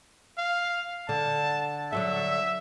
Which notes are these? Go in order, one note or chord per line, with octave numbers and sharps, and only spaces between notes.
F5
D3 A5
D3 F#3 A4 E5